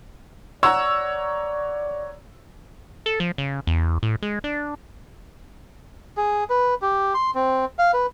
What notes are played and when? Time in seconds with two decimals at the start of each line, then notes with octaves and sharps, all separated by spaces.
0.63 C#5 D5 F#5 A#5 E6
3.06 A4
3.20 F3
3.38 C#3
3.67 E2
4.03 A2
4.23 G#3
4.44 D4
6.17 G#4
6.50 B4
6.82 G4
7.14 C6
7.35 C4
7.79 F5
7.94 B4